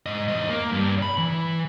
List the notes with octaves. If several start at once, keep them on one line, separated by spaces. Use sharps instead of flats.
G#2 D#5
E2 D#5
A#3
G2
B5
E3